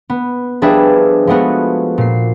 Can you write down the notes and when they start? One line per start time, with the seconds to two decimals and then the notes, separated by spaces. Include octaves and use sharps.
0.10 B3
0.62 F3 G3 D4 G#4 B4 E5
1.27 F3 G#3 A3 B3 F#4
1.98 A#2 C7